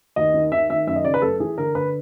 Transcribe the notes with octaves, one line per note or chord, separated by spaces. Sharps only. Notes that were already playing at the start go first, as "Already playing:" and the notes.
D#2 D#5
D#3
D#3 E5
D#3 E5
F#2 E5
D#5
C#3 D5
B4
F#2 A4
E3 G#4
D3 A#4
D3 B4